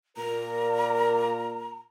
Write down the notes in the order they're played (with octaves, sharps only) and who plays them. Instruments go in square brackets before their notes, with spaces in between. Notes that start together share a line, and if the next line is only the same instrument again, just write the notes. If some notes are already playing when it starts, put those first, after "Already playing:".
[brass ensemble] A#2 A#4 [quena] A#5